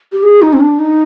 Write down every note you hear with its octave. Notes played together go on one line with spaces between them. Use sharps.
G4
G#4
D#4
C4
D4
D#4